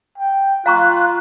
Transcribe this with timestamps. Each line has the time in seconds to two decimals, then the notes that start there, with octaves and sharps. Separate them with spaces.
0.18 G5
0.66 F4 F5 A#5 C#6 F#6